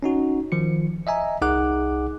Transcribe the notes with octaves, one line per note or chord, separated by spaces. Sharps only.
C#4 D#4 F#4
D#3 F3 C#7
D#5 E5 G#5 A#5
C2 D#4 G#4 F#5 D6 F#6